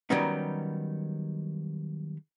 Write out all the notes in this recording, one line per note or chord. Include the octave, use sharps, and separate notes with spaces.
D#3 F#3 G3 B3 C#4 D#4